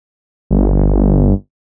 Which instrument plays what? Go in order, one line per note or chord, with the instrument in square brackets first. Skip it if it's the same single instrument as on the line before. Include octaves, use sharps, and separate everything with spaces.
[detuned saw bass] G1